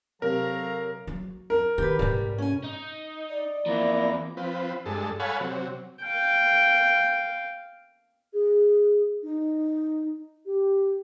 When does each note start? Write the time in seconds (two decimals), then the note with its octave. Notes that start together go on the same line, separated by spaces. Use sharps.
0.22 C3 F#3 A4 A#4 F5 A#5
1.07 F#3
1.50 A#4
1.78 D#3 G4 B4
1.99 G#2 C3 G3
2.38 C#4 G#5
2.63 D#4
3.30 D5
3.66 E2 F3 A#3 E4 A#5
4.37 F3 C4 B4
4.86 G2 G#3 A4
5.20 A4 C#5 F5 F#5 G#5 B5
5.40 C3 F#3
6.03 F5 G5
8.34 G#4
9.23 D#4
10.46 G4